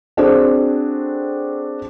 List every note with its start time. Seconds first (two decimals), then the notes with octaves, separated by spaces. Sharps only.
0.17 C4 D4 F#4 G#4 A4 C5